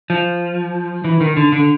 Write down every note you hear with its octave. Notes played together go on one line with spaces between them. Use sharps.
F3
E3
D#3
D3
D3